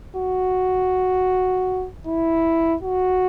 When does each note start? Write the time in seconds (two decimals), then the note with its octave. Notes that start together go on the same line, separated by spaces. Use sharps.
0.17 F#4
2.07 E4
2.83 F#4